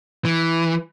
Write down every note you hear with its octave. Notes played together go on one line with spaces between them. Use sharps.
E3